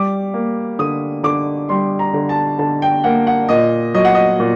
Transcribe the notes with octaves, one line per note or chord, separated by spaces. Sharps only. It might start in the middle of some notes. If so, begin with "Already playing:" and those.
Already playing: G3 D6
A#3
D3 D#6
D3 D6
G3 C6
A#5
D3
A5
D3 A5
G5
A#3 F#5
F#5
A#2 D#5
F#3 D#5
F#5
D#5
A#2